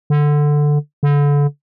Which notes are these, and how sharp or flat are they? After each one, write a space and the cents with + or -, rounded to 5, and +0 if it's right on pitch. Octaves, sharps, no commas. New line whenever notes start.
D3 +5
D3 -30